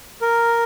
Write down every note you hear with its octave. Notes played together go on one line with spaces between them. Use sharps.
A#4